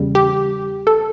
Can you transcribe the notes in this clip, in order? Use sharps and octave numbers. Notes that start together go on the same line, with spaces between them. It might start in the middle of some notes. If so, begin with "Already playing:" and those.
Already playing: E2 C#3 G3
G4
A4